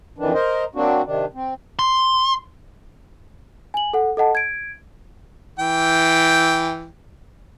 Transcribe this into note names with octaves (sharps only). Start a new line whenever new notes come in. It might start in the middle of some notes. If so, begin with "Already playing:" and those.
F2 D#3 E3 D4
A#4 C5 D#5
F#3 A#3 C4 D4 F#4
C3 D#3 D4
C4
C6
G#5 F#7
A4 F#5
A4 D#5 F#5 A5
G#6 D7
E3 G5